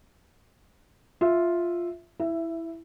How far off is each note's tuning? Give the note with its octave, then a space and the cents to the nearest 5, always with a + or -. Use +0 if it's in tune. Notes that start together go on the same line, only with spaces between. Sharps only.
F4 +0 E5 +0
E4 +0 E5 +15